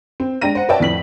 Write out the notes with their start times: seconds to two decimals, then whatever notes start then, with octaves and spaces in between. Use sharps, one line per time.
0.20 C4
0.41 G#3 D4 G5 A#5 A#6 D#7
0.55 C5 F#5
0.69 B4 C#5 D5 E5 G5 A5
0.80 F2 A2 B6 F#7